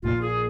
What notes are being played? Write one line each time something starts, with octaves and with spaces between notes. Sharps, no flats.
A#1 A#2 A#3 F4
G#4